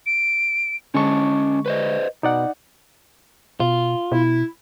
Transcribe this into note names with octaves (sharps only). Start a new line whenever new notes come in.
D7
D3 G#3 C#4 D#5 A5 C#6
B4 C5 D#5
B2 D#4 D5 F#5
B2 F4
B2 E4